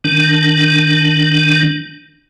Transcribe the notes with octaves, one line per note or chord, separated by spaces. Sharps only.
D#3 D4